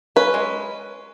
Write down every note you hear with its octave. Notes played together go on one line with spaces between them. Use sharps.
C#4 B4
G#3